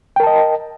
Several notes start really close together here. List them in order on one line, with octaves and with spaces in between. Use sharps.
G5 A#4 A5 D#5